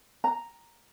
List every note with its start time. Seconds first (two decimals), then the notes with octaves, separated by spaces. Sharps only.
0.24 A#5